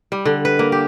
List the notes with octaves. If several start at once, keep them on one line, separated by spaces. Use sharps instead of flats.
G3
D3
B4
A#3
G4